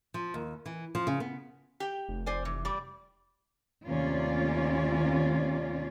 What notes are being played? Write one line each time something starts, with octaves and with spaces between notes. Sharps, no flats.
F3
D#2
E3
F3
C#3
B3
G4 G5
F1
C5 D5 G#5
E3
G3 D5
D#2 C3 A3 C#4 F4 D5